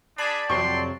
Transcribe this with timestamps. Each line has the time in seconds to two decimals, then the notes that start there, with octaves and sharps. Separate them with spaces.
0.18 D4 G#4 D5 A5 B5
0.50 F2 C3 F#3 G5 C6 C#6